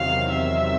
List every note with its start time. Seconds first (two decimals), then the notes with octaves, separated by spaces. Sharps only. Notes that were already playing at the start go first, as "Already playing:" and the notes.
Already playing: E2 C3 D#3 F#3 F5
0.31 E5